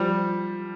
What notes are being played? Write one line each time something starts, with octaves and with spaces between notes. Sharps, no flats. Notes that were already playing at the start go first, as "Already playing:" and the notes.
Already playing: F3 G3